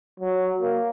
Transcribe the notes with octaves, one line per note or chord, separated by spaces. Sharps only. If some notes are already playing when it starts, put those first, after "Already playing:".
F#3
A#3